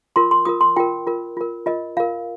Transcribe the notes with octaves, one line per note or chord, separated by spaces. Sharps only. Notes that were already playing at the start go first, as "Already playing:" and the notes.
F4 A#4 C6
C6
F4 A#4 D#6
C6
F4 A#4 G5
F4 A#4
F4 A#4
F4 A#4 D#5
F4 A#4 F5